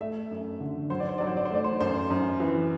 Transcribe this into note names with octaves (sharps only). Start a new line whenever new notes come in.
A3 E5
F#2
D3
F#3 C5
D5
C5
F#3 D5
C5
D5
C5
A3 D5
C5
F#2 C5
F#2
E3